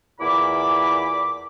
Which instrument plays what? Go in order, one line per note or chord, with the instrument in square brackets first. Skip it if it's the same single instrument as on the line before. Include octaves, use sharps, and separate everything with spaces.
[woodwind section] E2 A#2 E4 B5 D6